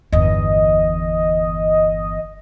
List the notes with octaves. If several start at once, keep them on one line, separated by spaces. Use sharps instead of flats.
G1 E2 D#5